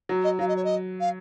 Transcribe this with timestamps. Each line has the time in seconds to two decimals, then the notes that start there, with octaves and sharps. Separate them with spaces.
0.09 F#3
0.24 D#5
0.39 F#3 F5
0.48 D#5
0.56 C#5
0.64 D#5
1.00 F5